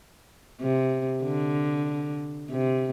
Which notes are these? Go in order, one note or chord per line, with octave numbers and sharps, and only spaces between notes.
C3
D3
C3